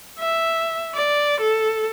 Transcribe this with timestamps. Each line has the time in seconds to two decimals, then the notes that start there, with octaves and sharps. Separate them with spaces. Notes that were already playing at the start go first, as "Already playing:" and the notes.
0.19 E5
0.94 D5
1.41 A4